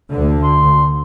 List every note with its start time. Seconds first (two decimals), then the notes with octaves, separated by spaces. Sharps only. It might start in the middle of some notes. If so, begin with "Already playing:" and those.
0.11 D2 D3
0.44 C6